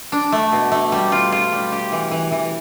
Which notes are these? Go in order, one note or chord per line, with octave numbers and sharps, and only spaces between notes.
D4
A3
B2
A3
G3
F4
F4
G3
G4
E3
E3
E3